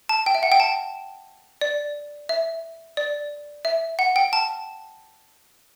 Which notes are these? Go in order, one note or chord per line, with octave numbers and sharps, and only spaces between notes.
A5
G5
E5
F#5
G5
A5
D5
E5
D5
E5
F#5
G5
A5